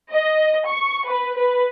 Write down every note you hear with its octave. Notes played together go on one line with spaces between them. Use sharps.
D#5
C#6
B4
B4